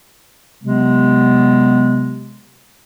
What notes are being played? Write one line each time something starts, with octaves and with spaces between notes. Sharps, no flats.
C3 F#3 G#3 B3